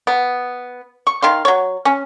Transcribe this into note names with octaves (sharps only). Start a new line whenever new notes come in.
B3
C#6
D#3 F5 C6
F#3 C#5
C#4